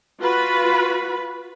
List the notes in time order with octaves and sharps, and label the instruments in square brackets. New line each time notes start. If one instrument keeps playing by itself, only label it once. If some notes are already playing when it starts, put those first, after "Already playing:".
[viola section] F4 F#4 B4 B5